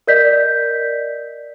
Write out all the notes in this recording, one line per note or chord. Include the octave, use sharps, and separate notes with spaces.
A#4 D5 D#5 G6 B6